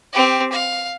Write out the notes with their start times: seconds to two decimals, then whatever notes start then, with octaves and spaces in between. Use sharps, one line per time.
0.13 C4 G4
0.52 F5